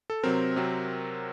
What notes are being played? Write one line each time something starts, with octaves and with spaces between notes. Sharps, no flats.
A4
C3 F#3 C4 A#4
C3 F#3 C4